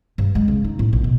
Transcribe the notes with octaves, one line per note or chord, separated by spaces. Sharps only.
G2
G#3
C#3
D#4
A2
A#1
B2